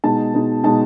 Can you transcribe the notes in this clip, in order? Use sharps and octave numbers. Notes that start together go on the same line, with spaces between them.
B2 G#3 D#4 A5
B2 G#3 D#4
B2 G#3 D#4 A5